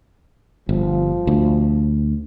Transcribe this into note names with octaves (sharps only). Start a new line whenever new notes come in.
G1 F3
D2